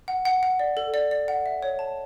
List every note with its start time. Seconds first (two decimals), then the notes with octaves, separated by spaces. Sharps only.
0.08 F#5
0.25 F#5
0.43 F#5
0.59 D5
0.77 A4
0.94 D5
1.11 D5
1.28 F#5
1.46 E5
1.63 C#5
1.79 A5